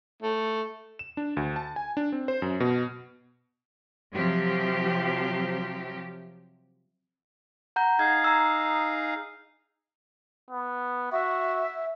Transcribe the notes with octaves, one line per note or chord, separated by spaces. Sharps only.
A3
E7
D4
D2
A5
G#5
D4
C4
C5
F#2
B2
C3 F3 F#3 G4
F#5 A#5 G6
D#4 G#4 F5 G#6
A#5 E6
B3
F#4 E5